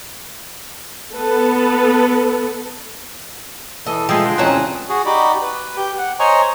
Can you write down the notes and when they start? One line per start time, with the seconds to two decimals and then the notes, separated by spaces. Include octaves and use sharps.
1.13 B3 A4 B4
3.86 E3 A4 D#5
4.09 F3 G#3 G#4 A4 D#5 G5 C7
4.26 D3 F4
4.38 E2 F#3 C4 C#4 D#4 G#5 A5 F#6
4.53 D2
4.89 F#4 G#4
5.06 D#4 F#4 G4 D5 B5
5.42 B4
5.77 G4
5.98 F#5
6.20 C5 C#5 D#5 G#5 A#5 C#6